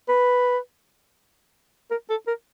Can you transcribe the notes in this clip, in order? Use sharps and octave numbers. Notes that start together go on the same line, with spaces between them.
B4
A#4
A4
A#4